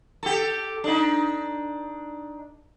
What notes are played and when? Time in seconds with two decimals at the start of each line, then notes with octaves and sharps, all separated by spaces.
0.23 G4 A4
0.84 D4 D#4